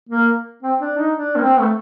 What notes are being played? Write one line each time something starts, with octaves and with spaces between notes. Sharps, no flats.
A#3
C4
D4
D#4
D4
A#3
C4
A3